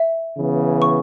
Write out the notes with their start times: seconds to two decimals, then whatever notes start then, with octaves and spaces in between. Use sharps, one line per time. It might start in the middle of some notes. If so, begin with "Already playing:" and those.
Already playing: E5
0.36 C#3 E3 B3
0.82 C#6